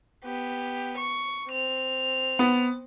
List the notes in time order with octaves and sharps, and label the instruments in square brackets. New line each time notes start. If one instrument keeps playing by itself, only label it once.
[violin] B3 G4
C#6
C4 F7
[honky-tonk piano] B3